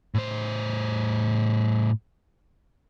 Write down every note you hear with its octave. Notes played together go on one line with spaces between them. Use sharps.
A2 C5